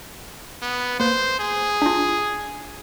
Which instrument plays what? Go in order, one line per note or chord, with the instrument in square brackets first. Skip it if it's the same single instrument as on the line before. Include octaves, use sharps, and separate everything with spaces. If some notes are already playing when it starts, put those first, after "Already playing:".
[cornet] B3
[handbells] A#3 B4 [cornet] C5
[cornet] G#4
[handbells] D4 F4